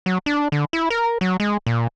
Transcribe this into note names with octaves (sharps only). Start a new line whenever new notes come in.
F#3
D4
D3
E4
A#4
F#3
G#3
A#2